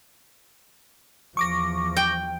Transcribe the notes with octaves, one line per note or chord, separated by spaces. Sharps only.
E2 F3 C#6 D6 A#6
G5